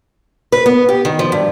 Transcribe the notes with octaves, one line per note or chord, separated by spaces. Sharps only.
B4
B3
G4
D#3
F3
G2